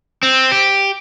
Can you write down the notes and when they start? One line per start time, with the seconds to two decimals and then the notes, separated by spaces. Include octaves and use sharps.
0.23 C4
0.52 G4